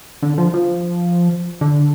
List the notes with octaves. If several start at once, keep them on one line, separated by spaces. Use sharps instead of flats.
D3
F3
F3
D3